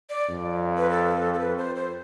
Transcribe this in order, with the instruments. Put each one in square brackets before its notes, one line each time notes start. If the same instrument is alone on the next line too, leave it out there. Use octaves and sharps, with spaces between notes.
[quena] D5
[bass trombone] F2
[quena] B4
A4
A4
B4
C5
C5